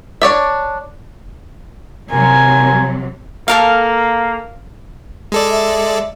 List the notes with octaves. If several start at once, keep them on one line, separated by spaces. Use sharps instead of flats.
D4 C#5 D5 E5
C3 F#3 A#4 G#5
A#3 A4 A#4 F5
G#3 A4 D5
E5